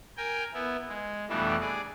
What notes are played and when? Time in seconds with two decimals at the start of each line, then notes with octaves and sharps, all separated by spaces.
0.17 A#4 G5 G#5
0.54 B3 E4
0.88 G#3
1.29 F2 B2 E3 G3 A3 D4
1.60 G#4 D5